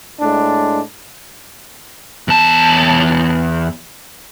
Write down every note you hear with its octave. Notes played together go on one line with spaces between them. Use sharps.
A2 G#3 D4
E2 A5